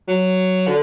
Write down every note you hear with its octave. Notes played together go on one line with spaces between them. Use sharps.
F#3
D3